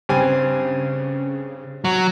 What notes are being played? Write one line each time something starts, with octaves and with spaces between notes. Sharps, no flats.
G2 C#3 C4 G#5
F#3